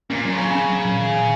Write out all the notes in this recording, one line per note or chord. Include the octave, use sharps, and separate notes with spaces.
A#2 C#4
F#3
C#3
C#4
C#4
F#3
A#2
D#3
D#3